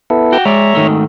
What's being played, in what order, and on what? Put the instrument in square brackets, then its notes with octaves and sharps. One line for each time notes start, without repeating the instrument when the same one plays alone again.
[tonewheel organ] B3 E4 A4
[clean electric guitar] F#4 G5
[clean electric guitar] G#3 D5 [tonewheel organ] C#5 E5 A#5
[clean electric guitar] G#2 D#3 A3